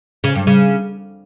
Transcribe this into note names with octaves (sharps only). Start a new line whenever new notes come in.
C#3
G2
C#3